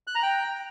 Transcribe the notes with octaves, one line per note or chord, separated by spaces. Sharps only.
F#6
A#5
G5